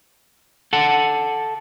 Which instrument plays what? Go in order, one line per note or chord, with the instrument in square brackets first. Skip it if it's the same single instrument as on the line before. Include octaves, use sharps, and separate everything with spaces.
[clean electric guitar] A4 F#5